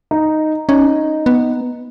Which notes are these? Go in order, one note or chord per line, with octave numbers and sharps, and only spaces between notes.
D#4
C#4 D#4
B3